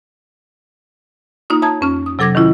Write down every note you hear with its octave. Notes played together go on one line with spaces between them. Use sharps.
A#3 D#4 F4 D#6
C#5 E5 A5 A#5 D#6 G#6
F2 C#4 F6
D#6
C3 F#3 A4 D6 G#6 A#6
D#3 C#4 E4 F4